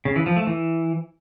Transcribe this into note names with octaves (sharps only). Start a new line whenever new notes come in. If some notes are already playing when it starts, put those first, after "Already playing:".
C#3
E3
F3
A3
E3